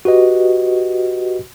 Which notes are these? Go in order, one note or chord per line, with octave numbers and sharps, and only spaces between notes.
F#4 G4 B4 D#5